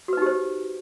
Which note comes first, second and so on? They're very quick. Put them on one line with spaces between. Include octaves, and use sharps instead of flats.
F#4 B4 D#4 G4 C5